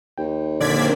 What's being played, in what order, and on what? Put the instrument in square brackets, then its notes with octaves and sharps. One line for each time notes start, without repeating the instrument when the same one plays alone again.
[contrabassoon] D#2 [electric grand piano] G5
[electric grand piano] A#1 D3 [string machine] A#3 C4 D4 [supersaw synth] D5 G#6 B6